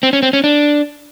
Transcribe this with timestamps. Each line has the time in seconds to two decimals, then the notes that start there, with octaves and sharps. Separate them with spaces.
0.03 C4
0.13 C#4
0.23 C4
0.33 C#4
0.44 D4